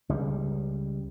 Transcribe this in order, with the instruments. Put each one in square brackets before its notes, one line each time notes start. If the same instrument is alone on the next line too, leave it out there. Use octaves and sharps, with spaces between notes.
[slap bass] C#2 G3